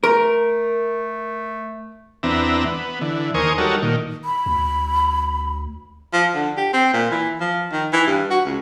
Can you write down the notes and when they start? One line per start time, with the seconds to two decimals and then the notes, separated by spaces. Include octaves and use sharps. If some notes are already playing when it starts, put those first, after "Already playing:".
0.04 A3 A#4
2.23 E2 B3 C4 D4 E5 A#5
2.65 B3
3.01 D3 E3
3.34 D#2 A#4 C5 G#5 C#6 D#6
3.58 G3 D#4 F#4 A4 A#4 C#5
3.82 A#2 D#3
4.25 B5
4.46 D2
6.13 F3
6.35 D3
6.57 G4
6.73 C4
6.93 A#2
7.11 E3
7.40 F3
7.72 D#3
7.93 E3
8.07 G2
8.30 F#4
8.45 C#2